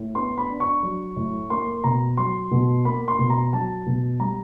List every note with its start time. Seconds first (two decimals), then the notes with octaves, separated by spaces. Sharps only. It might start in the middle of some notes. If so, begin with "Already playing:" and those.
Already playing: A2
0.15 B3 C6
0.38 B5
0.49 D4
0.60 C#6
0.83 F#3
1.16 A2
1.50 A#3 C6
1.84 B2 A#5
2.17 F#3 C6
2.51 B2
2.85 A#3 B5
3.08 C6
3.19 B2
3.30 A#5
3.53 F#3 A5
3.86 B2
4.20 G3 A#5